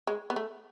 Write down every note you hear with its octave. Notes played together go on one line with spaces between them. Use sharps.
G#3
B3
A3